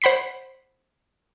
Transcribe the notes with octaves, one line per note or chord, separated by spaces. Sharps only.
C5 F#5 B5 B6 C7